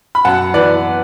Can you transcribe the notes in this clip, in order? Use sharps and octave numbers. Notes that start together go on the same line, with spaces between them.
B5
F#2 F#5 A5
E3 B4 D5